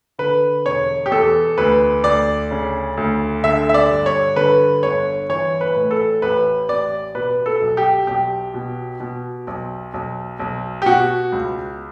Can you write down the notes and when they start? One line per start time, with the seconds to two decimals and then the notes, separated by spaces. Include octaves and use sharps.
0.18 D3 B4
0.65 E1 C#5
1.06 G4
1.12 E2 A4
1.58 D2 B4
2.04 D2 D5
2.51 C#3
2.97 D2
3.44 D3 E5
3.69 E5
3.74 D5
3.90 G2
4.06 C#5
4.36 D3 B4
4.83 G1 C#5
5.29 E3 C#5
5.61 B4
5.76 A2
5.91 A4
6.22 A1 B4
6.68 A1 D5
7.15 B2 B4
7.46 A4
7.61 B1
7.77 G4
8.07 B1 G4
8.54 B2
9.00 B2
9.47 B1
9.94 B1
10.40 B1
10.82 G4
10.86 B2 F#4
11.32 C#2